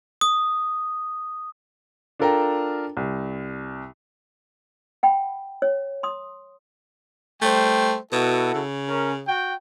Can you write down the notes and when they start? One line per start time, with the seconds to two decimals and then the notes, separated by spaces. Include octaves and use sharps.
0.21 D#6
2.20 D4 F4 A4 A#4 G5 A#5
2.97 C2
5.03 F#5 G5 B5
5.62 C#5
6.03 C6 D#6
7.42 G3 A3 C5 G5
8.13 B2 E4 F#4 A4
8.55 C#3
8.89 C#4 A#4
9.28 F#4 G5